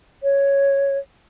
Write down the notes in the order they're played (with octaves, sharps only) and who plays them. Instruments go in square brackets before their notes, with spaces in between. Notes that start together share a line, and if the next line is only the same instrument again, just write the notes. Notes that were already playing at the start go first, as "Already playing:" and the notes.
[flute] C#5